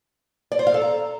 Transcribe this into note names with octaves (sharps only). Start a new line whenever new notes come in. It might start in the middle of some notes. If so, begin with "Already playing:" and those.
D5
C5
F5
A4
A#5